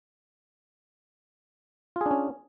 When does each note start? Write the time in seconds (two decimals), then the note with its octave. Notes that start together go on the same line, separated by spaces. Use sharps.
1.96 F4
2.01 G#4
2.06 D4
2.11 C#4